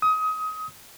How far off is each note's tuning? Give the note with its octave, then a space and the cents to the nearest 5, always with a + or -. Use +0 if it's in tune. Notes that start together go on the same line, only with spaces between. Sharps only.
D#6 +25